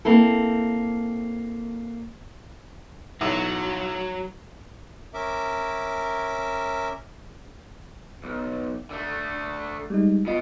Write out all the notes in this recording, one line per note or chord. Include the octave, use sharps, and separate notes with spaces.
A#3 C4 E4 A4
B1 F#3 E4 F#4
C#4 A#4 E5 D6
B1
D3 A3
G3 G#3 D#4
B2 F4 D#5